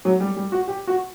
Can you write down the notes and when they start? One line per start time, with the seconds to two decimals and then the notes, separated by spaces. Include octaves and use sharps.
0.05 F#3
0.20 G3
0.36 G3
0.52 F#4
0.68 G4
0.87 F#4